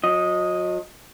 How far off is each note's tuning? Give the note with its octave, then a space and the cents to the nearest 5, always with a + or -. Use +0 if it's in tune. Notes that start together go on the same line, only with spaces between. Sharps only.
F#3 -45 D#5 +0